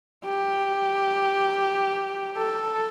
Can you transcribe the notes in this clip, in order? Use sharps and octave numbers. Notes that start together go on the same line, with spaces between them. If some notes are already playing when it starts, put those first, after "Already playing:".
G4
A4